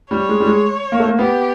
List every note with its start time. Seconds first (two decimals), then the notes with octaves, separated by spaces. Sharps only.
0.11 G3 C#5
0.29 G#3
0.40 G3
0.47 G#3
0.92 A#3
1.00 A3
1.08 A#3
1.19 B3 G4